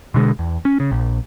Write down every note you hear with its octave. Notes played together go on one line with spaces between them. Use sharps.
B2 D3 G#3
E2
C#4
C#3
A#1